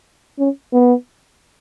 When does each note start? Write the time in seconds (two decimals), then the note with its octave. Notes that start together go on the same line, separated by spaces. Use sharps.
0.39 C#4
0.73 B3